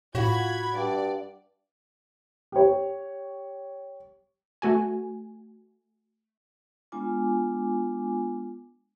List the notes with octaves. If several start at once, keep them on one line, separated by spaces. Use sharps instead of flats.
A2 F4 F#4 B5 G#6
G2 D5
G4 C#5
A3 F#4 G#5
G#3 B3 D4 F4 G#5 D6